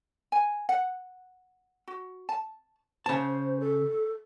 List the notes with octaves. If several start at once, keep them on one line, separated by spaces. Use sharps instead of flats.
G#5
F#5
F#4
A5
C#3 C5 A5
A4